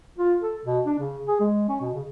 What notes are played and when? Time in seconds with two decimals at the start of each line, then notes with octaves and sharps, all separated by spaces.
0.18 F4
0.42 A4
0.65 B2
0.86 D4
0.99 C#3
1.28 G#4
1.40 G#3
1.69 C#4
1.81 B2
1.94 C#3